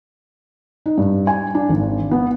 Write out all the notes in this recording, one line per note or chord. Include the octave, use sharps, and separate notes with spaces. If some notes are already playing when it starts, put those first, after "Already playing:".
D#4
G2
G#5
D4
G#1
B3